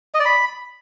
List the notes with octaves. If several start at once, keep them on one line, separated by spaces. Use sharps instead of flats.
D#5
D5
B5